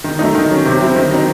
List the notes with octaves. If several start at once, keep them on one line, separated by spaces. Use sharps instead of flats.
D#3
F#3 A3 D#4
D#3
F#3 C#4
C3
F#3 C4 E4
D#3
F#3 C4 D#4